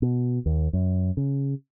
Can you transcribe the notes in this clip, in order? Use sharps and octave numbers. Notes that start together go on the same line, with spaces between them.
B2
D#2
F#2
C#3